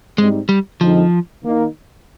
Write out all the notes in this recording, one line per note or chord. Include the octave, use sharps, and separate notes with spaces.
G#2 G3 G#3 C4 D#4
G3
F2 D3 F3 G#3 C4 D#4
D#3 A#3 D#4